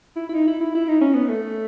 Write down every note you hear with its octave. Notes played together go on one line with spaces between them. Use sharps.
E4
E4
D#4
E4
E4
E4
D#4
C#4
B3
A3